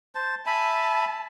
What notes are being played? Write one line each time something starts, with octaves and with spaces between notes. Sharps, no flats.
C5 A5
E5 G#5 A5 B5